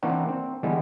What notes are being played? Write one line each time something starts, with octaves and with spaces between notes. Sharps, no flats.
E3 A#3 C4 D4 F#4
C4
D3 E3 G3 G#3 B3